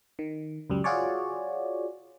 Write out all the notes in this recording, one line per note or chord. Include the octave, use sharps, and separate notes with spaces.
D#3
C#2 F#2 G3
F4 F#4 G#4 C#5 D5